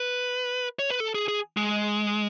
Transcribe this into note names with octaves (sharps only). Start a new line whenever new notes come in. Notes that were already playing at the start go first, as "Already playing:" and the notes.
Already playing: B4
C#5
B4
A4
G#4
G#4
G#3